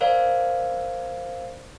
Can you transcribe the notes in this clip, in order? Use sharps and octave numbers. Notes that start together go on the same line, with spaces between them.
A#4 C5 D5 F5